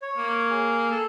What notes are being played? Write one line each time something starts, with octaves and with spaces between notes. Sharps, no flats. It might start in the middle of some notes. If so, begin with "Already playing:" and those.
C#5
A#3
G#4
A4